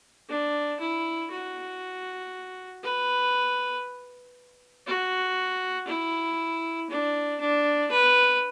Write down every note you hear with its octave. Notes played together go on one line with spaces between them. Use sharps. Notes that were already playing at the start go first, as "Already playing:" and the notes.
D4
E4
F#4
B4
F#4
E4
D4
D4
B4